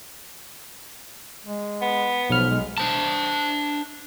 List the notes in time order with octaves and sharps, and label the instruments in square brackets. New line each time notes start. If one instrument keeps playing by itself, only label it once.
[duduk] G#3
[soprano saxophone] B3
[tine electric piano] B1 F6 [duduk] F3
[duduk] G#3
[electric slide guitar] D4 C5 A5